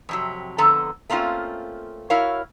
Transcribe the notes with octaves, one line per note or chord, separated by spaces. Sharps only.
F2 C3 F#3
F2 D3 B3 A4 A#5
A3 A#3 C4 C#4 F4
E4 F#4 A#4 C#5 F5